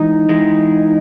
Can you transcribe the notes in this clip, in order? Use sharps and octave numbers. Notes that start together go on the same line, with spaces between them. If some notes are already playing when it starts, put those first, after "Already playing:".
Already playing: E3 G#3 D#4
E3 G#3